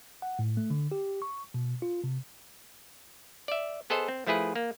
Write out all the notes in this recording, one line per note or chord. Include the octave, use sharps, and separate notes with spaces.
F#5
A2
A3
D3
G4
C#6
B2
F4
C3
D5 E5
B3 G#4 A4 C5 D#5
C4
F3 A3 E4 G#4 B4
A#3